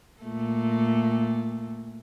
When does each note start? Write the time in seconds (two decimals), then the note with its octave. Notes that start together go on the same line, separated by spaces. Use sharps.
0.22 A#2 A3